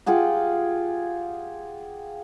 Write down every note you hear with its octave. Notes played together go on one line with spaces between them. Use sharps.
F4 G4 G#4 F#5